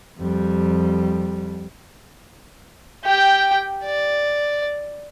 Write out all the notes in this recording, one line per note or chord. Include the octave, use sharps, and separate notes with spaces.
F2 G3
G4 G5
D5